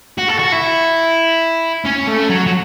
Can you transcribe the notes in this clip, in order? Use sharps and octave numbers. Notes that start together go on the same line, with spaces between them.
F#4
A4
F#4
E4
C#4
A3
F#3
F#3